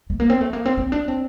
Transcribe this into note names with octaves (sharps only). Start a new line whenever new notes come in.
A3
A#3
C4
A3
A#3
C4
C4
D4
C4